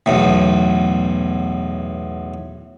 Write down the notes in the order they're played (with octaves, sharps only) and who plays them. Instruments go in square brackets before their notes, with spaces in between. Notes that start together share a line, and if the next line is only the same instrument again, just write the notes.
[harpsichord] B1 E2 A2